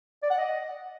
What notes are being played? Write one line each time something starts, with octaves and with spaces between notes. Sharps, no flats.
D5
F#5
D#5